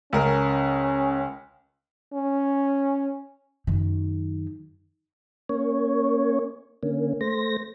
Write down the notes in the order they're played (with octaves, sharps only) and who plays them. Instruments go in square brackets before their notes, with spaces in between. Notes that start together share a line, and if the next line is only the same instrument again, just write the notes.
[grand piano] C#2 A#4 [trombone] C#4
[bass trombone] C#4
[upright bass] F#2 D#3
[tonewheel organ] A#3 C#4 C#5
D3 A#3 C#4
A3 C5 A#6